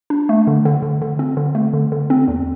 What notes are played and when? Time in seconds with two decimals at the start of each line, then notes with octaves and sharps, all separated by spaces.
0.10 D4
0.29 A3
0.47 D3
0.65 D3
0.82 D3
1.01 D3
1.19 C4
1.37 D3
1.55 A3
1.73 D3
1.92 D3
2.10 C4
2.28 E2